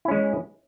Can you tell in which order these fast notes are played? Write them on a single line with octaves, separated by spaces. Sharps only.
E4 C#4 G#3